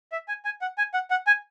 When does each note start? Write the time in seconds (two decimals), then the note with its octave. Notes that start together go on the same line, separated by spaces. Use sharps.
0.12 E5
0.28 G#5
0.45 G#5
0.61 F#5
0.78 G#5
0.94 F#5
1.10 F#5
1.27 G#5